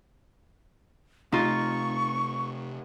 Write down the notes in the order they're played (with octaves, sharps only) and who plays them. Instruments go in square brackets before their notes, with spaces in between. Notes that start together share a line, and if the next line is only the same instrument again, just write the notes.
[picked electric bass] C3 A3 [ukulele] D#4 F4 [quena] C#6